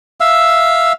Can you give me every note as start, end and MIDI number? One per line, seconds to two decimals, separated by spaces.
0.20 0.93 76
0.20 0.93 77
0.20 0.93 88